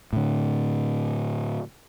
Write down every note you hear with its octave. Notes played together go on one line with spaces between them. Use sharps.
A2 D3